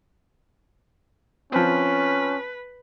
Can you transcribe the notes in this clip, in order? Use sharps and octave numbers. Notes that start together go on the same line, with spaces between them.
F3 C4 C#4 B4